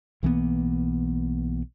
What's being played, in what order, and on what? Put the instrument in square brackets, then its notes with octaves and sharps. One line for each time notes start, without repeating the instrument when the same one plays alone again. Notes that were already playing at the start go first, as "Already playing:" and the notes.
[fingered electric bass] B1 E3 A#3 B3